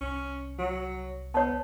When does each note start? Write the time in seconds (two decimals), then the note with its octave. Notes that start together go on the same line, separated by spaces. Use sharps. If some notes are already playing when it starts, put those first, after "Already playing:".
0.01 C2 C#4
0.59 F#3
1.34 B3 C#5 A5